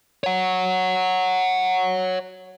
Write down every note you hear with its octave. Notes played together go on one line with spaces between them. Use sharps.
C#5 F#5